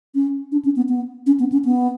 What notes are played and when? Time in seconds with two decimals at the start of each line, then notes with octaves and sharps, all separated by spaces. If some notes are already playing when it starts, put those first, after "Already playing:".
0.15 C#4
0.52 D4
0.65 C#4
0.76 B3
0.89 B3
1.26 C#4
1.40 B3
1.52 C#4
1.65 B3